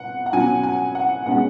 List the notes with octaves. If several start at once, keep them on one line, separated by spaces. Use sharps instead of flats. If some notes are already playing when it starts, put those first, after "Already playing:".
Already playing: B2 F#5
F#5
B2 F#3 C#4 G#5
G#5
F#5
B2 G#3 C#4 F#5